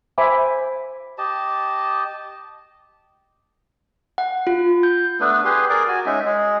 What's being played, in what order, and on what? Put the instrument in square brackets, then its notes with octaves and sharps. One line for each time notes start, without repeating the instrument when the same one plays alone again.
[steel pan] C5 E5 G#5 B5 D6
[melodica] G4 D#5 A5
[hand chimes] F#5
F4
G6
[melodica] A3 B3 D4 B4
G4 G#4 B4 C6
G#4 A#4 D5 D6
F#4 G#5
G#3 C#4 D#4 E5
G#3 G#4